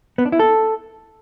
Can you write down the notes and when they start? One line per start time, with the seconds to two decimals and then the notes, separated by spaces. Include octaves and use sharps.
0.18 B3
0.25 D4
0.32 E4
0.39 A4